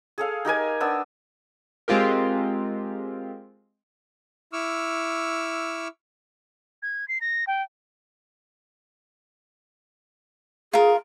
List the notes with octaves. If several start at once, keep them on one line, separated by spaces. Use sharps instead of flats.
G#4 A4 F5
D#4 G4 A#4 G#5
B3 D4 E6
G#3 C4 F4 G4 A#4
E4 C#6 D6 E6 F6
G#6
C7
A#6
G5
F4 G#4 A#4